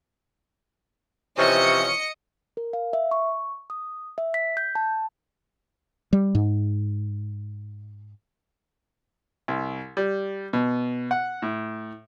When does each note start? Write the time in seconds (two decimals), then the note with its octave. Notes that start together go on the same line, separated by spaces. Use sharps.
1.38 C3 E3 F3 C#4 D#5 C#7
2.57 A#4
2.73 F5
2.93 E5
3.11 C#6
3.70 D#6
4.18 E5
4.34 B6
4.57 G6
4.75 A5
6.13 G3
6.35 G#2
9.48 C2
9.97 G3
10.53 B2
11.11 F#5
11.42 A2